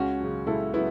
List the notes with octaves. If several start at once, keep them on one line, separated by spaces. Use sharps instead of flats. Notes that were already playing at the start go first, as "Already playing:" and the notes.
Already playing: C#2 C#4 F#4
C#3 F#3
C#2 E4 A4
C#3 F#3 B3 E4